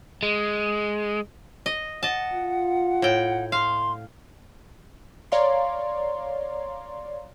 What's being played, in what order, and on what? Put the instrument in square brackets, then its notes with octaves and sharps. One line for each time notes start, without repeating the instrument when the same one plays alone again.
[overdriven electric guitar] G#3
[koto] D#5
[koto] D#5 A5 [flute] F#5
[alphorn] F4
[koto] A2 G5
[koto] F5 [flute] C6
[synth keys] C#5 D5 F5 A#5 C6